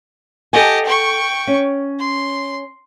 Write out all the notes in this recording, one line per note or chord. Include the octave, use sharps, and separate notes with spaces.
G4 A4 D#5 F#5 G#5
G5 C#6
C#4
C6